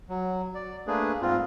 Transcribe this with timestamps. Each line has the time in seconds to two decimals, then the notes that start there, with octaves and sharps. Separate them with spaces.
0.09 F#3
0.55 D5
0.87 A3 A#3 D4 G#4 B4
1.22 G#2 C4 F4